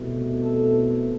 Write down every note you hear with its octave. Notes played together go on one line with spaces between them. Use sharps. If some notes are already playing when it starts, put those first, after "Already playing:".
Already playing: C2 B2 A3
A4